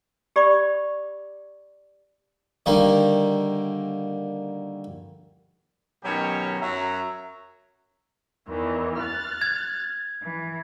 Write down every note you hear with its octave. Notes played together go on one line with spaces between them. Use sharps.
G4 D5 B5 D6
D3 D#3 G3 A#3
B2 D#3 F#3 C#4 G4 C#5
F#2 C#5 E5 A#5
E2 D#3 E3
F6 F#6 A6
G#6
E3